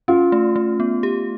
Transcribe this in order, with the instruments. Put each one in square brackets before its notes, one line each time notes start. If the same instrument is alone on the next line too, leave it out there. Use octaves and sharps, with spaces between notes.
[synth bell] C#4 [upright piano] F4
[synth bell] A3
A3
B3
G4